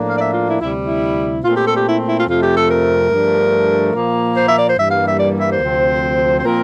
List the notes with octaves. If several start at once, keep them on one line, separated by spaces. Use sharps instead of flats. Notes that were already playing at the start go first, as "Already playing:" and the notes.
Already playing: A2 F3 A#3 D4
F5
D5
E5
F4
E4
D2 C3 G3 E4
E4
A#2 A3 C4 F4
G4
A4
G4
E4
E4
F4
F2 C3 F3 A3 F4
G4
A4
A#4
G2 F3 A3 D4
A#2 F3 A#3
C5
E5
D5
C5
G2 E3 G3 A#3 E5
F5
E5
D5
E5
C5
D2 C3 F3 C4
C5
A#2 F3 C4 A#4